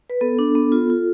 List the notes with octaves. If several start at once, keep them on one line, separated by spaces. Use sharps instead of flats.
B4
B3 A4
D4
B3
F4
F4